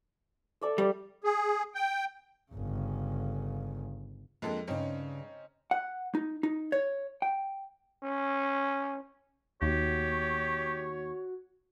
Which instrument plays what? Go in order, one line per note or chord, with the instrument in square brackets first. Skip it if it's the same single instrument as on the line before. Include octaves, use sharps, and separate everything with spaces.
[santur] A4 D5 E5
[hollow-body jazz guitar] G3 [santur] G4 D5
[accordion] G#4
G5
[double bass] G1 C#3
[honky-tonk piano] F2 G#3 A4 [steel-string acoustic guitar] A#3 D4
[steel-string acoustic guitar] G2 C#3 [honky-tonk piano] C4 C#4 D#4
[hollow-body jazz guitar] F#5
D#4
D#4
C#5
G5
[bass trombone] C#4
[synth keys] D#2 [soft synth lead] F#4 [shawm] G4 [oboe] C#5